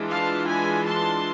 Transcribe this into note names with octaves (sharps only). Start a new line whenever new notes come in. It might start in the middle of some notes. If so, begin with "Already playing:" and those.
Already playing: E3 G#3 D4 F4
F5 A5
G#5 B5
A5 C6